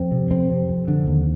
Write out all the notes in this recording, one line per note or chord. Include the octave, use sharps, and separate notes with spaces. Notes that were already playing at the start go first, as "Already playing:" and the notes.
Already playing: F2 C4
C3
F2 C4
C3
F2
D3
D#2